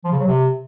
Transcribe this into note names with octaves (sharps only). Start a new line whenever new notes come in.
F3
C#3
F#3
C3